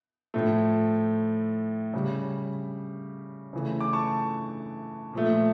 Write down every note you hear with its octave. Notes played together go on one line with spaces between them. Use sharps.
A2 F3 A3
C#3 G3
C#3 E3 A3
D6
A5 C#6
A#2 F3 A3